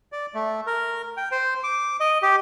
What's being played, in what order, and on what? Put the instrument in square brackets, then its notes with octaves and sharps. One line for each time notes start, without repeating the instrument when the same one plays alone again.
[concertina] D5
A3
A#4
G5
C5
D6
D#5
G4